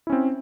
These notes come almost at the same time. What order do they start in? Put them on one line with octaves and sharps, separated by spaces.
E4 C#4 C4